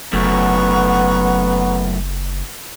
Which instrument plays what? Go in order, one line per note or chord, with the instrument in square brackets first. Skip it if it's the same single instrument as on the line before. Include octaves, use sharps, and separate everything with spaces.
[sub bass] F#1 [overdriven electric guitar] F#2 A3 [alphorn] B3 [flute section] F#5 A#5 C#6